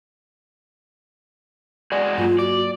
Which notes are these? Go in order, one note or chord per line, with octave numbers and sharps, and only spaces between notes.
G#3 F#4 G#4 D5
G2 F#3 A#3 F4
F#4 D5